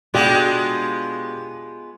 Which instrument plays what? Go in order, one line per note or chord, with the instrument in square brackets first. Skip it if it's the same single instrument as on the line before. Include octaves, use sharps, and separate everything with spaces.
[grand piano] B2 D4 G4 [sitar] G#3 B3 F4